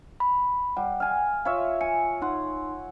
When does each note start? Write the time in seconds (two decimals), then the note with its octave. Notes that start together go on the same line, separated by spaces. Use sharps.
0.20 B5
0.77 G3 F#5
1.00 F5 G#5
1.45 F4 C#5 E5 F5
1.81 G#5 C#7
2.22 D#4 F#5 C6